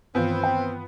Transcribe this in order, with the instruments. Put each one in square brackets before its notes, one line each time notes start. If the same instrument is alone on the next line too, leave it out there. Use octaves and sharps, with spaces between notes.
[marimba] G2 D#3 E3 [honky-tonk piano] B3 F4 [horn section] C4
[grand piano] G5